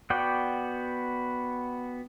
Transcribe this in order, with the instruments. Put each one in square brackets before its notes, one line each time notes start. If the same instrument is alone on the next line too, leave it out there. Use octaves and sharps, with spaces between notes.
[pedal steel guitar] B3 F#4 D5 G5